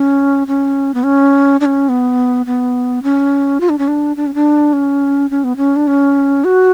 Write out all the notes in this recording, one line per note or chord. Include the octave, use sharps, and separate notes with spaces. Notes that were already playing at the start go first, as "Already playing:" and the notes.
Already playing: C#4
C#4
B3
C#4
D4
C#4
B3
B3
C#4
F4
D4
C#4
D4
D4
C#4
D4
C#4
C#4
B3
C#4
D4
C#4
F#4